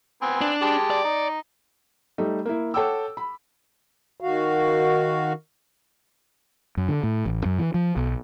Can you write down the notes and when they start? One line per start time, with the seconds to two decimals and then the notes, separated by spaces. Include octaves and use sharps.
0.22 B3 C4 G#5
0.41 D4
0.62 G#3 G4 A5
0.90 D5
1.04 D#4
2.18 G3 A3 D#4
2.46 A#3 E4
2.74 A4 C#5 F#5 G5 D6 E6
3.17 B5
4.20 D#3 F#4 F5
6.77 F#2
6.89 D3
7.04 A2
7.26 A1
7.45 F#2
7.59 E3
7.74 F3
7.96 B1